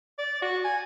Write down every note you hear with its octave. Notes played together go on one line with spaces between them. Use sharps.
D5
F#4
G#5